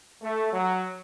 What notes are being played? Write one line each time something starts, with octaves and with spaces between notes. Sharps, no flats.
A3
F#3